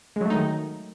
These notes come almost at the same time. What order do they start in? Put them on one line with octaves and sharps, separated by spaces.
G#3 F#3 A3 D#4 D#3